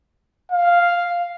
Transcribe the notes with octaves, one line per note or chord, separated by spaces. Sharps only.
F5